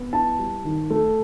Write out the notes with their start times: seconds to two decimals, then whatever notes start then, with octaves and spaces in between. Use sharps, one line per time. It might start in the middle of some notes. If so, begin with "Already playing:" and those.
Already playing: B3
0.13 E4 A5
0.39 G3
0.65 D#3
0.90 A3